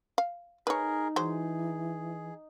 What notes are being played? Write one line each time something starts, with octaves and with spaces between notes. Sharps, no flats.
F5
D#4 G#4 A#4 B4 C#5
E3 F#3 G#3 G#4 C5